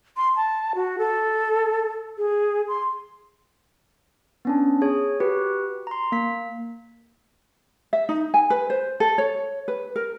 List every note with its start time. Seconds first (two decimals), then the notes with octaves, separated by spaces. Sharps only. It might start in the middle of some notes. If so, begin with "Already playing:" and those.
0.17 C6
0.36 A5
0.75 F#4
0.98 A4
2.18 G#4
2.68 C6
4.45 B3 C#4 D4
4.82 G#4 C#5
5.20 F#4 G4 B4
5.87 A#5 C6
6.12 A#3 B6
7.93 E5
8.09 D#4
8.34 G#5
8.50 B4
8.70 C5
9.00 A4
9.18 C#5
9.68 B4
9.96 A#4